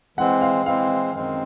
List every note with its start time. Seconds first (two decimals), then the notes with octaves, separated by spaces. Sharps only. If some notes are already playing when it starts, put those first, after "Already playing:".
0.18 E3 G#3 C4 F#5
0.41 F5
0.66 E3 G#3 C4 F5
1.14 F#2 D#3 G#3 C4